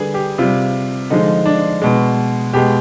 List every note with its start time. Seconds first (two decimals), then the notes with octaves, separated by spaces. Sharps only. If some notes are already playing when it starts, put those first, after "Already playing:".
Already playing: D3 G3 G#4 B4
0.14 G4
0.38 C3 G3 F4
1.10 D3 F3 G#3 D#4
1.46 D4
1.82 B2 G#3
2.53 B2 G#3 G4